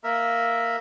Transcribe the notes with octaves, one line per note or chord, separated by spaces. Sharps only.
A#3 A#4 E5